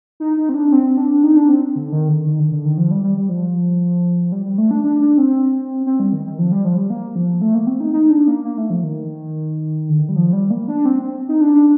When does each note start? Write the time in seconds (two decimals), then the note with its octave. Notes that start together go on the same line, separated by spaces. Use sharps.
0.20 D#4
0.37 D#4
0.49 C4
0.54 D4
0.72 C4
0.97 D4
1.23 D#4
1.36 D4
1.49 C4
1.75 D3
1.92 D#3
2.09 D3
2.26 D#3
2.40 D3
2.52 D3
2.65 D#3
2.77 F3
2.91 G3
3.03 G3
3.17 G3
3.29 F3
4.32 G3
4.45 G3
4.58 A3
4.71 D4
4.84 D4
5.01 D4
5.18 C4
5.86 C4
6.00 G3
6.13 D#3
6.26 D#3
6.39 F3
6.52 G3
6.65 F3
6.77 G3
6.90 A#3
7.15 F3
7.41 A3
7.55 A#3
7.67 C4
7.80 D#4
7.93 D#4
8.10 D4
8.28 A#3
8.44 A#3
8.58 A3
8.70 F3
8.83 D#3
9.89 D3
9.99 D#3
10.09 G3
10.16 F3
10.33 G3
10.50 A#3
10.68 D4
10.85 C4
11.02 C4
11.28 D#4
11.41 D4
11.54 D4